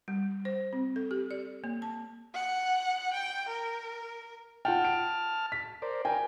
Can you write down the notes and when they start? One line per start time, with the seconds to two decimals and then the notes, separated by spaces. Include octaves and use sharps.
0.08 G3
0.45 C5
0.73 C4
0.96 A4
1.11 G4
1.31 D5
1.64 A#3
1.82 A5
2.35 F#5
3.13 G5
3.48 A#4
4.65 F4 F#5 G5 A5 F6
4.85 D7
5.52 B6
5.82 A#4 C5 D5
6.05 A#4 G5 G#5